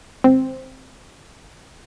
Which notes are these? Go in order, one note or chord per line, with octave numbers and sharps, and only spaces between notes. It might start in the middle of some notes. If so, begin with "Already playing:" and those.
G#1 C4